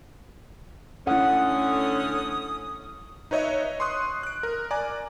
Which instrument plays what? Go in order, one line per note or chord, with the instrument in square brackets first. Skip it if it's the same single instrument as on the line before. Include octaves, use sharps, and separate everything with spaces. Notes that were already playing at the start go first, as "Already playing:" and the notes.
[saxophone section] D3 A3 C#4 [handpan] E4 F#5 [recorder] D#6
[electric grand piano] D#4 B4 C#5 D#5 E5
C6 C#6 D#6 F#6
F#6 D7
A#4
D5 G#5 A#5 D6